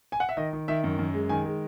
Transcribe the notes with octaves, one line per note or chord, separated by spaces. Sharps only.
G#5
F#5
E5
D#3 D#5
D#3
D#3 E5
F#2
F#2
G#3
D#3 G#5
G#3